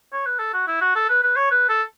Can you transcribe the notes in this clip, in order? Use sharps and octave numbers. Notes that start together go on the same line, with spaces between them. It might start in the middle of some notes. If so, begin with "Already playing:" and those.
C#5
B4
A4
F#4
E4
F#4
A4
B4
B4
C#5
B4
A4